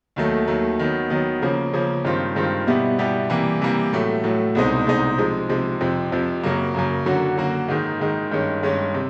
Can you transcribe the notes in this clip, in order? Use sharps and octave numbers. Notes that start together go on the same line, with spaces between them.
D#2 D#3 F#3 A3
D#2 D#3 F#3 A3
D#3 F#3 B3
D#3 F#3 B3
C#3 F3 A#3 C#4
C#3 F3 A#3 C#4
G2 D#3 G#3 C4 F4
G2 D#3 G#3 C4 F4
B2 G3 B3 E4 G4
B2 G3 B3 E4 G4
C3 E3 G3 A#3
C3 E3 G3 A#3
A2 F#3 A3
A2 F#3 A3
C2 B2 G#3 C4 D#4
C2 B2 G#3 C4 D#4
C3 F3 G#3
C3 F3 G#3
F2 C3 F3
F2 C3 F3
F#2 C#3 F#3 A#3
F#2 C#3 F#3 A#3
D3 F#3 A#3 C#4 F#4
D3 F#3 A#3 C#4 F#4
G#2 D#3 G#3
G#2 D#3 G#3
G2 D#3 G#3 C#4
G2 D#3 G#3 C#4
C3